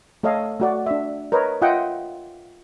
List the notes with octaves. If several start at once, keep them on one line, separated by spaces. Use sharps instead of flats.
A3 A4 C#5 D#5 F5
A3 F#4 D5
D4 E5
A#4 B4 C#5 D#5
F4 D#5 E5 F#5 G5